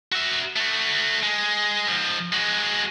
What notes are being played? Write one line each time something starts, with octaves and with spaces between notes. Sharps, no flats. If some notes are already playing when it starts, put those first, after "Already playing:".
F#4 E5
A3 F#4
G#3
G#2 F3
G#3 F#4